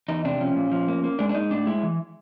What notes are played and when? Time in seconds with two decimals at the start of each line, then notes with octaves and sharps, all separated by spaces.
0.09 E2 D#4
0.24 C3 D4
0.40 F3 C#4
0.56 A#2
0.71 F3
0.88 A#3
1.04 A#3
1.19 G#3 D4
1.29 D4
1.35 G#3 D#4
1.51 A2 D4
1.66 G#3 E4
1.83 E3